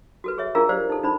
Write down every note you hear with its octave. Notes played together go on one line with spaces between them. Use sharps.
F#4 A4 B4
G#4 C#5 E5
D4 F4 G#4 A#4 F5 A#5
G4 C5 D5 F5
D#4 A4
D4 D#4 C5 B5